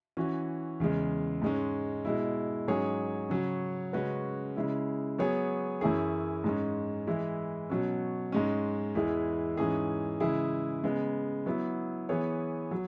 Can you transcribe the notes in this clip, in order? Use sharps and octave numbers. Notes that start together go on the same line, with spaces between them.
E3 C#4 F#4
E2 C#3 G#3
G#2 G#3 C#4
B2 G#3 E4
G#2 F#3 C#4 G#4 C#5
C#3 F#3 C#4
C#3 G#3 C#4 F#4 B4
C#3 G#3 E4
F#3 B3 G#4 C#5
F#2 E3 C#4 E4 G#4
G#2 G#3 C#4
E3 G#3 E4
B2 F#3 C#4
G#2 G#3 C#4
E2 E3 G#3 E4 G#4
G#2 E3 C#4 G#4
C#3 E3 G#3 E4 G#4
C#3 G#3 B3
F#3 B3 E4
E3 B3 G#4 C#5
F#3